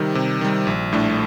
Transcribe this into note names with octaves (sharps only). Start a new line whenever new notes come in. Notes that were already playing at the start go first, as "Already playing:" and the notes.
Already playing: C3 D#3 G3
C3
D#3 G3
A#1
A2 A3 D4